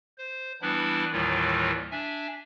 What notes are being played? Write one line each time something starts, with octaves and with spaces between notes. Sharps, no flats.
C5
E3 G3 B3 D4 E4 B4
D#2 A2 D#3 E3 G3 F4
D4 E5 G#5